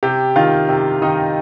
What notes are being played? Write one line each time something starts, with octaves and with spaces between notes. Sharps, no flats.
C3 G4
D#3 F4
C3
D#3 D#4 D#5